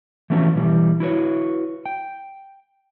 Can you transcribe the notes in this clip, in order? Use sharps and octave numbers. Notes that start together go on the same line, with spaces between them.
E3 F3 A3 B3 C#4 F#4
B2 E3 G3
E4 F#4 B4 C#5
G5